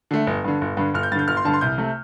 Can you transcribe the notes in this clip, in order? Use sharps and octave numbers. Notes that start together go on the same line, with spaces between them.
D3 A3
G1
G2 D3
G1
G2 D3
G1 F6
G6
G2 D3 G6 A6
G1 F6
C6
G2 D3 A5
C6
C2 G6
C3 A3